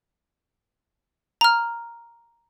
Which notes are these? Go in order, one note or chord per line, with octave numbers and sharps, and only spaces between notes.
A#5 F6